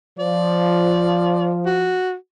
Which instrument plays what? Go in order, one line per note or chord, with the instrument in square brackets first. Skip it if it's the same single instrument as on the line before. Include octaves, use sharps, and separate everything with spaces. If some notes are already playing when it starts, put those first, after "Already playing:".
[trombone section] F3 [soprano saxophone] D5
[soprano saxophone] F#4